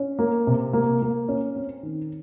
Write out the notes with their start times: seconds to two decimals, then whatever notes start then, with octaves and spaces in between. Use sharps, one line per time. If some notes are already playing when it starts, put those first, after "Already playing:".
Already playing: C#4
0.19 A#3
0.47 C3
0.73 A#3
1.02 A#3
1.28 C#4
1.56 C4
1.83 D#3